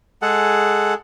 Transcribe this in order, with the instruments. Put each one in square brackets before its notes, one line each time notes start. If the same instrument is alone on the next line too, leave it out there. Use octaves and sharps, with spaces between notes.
[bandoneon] G#3 G#4 A4 F#5